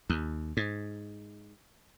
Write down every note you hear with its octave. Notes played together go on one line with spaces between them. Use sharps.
D#2
G#2